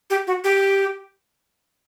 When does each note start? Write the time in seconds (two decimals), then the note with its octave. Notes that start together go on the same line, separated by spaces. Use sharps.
0.10 G4
0.27 F#4
0.44 G4